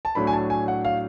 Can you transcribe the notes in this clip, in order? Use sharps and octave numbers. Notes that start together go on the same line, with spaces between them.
A5
A2 F#3 A3 D4 B5
G#5
A5
G#5
F#5
F5